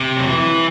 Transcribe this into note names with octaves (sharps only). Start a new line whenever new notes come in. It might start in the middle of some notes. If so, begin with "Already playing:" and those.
Already playing: C3
F#3
E3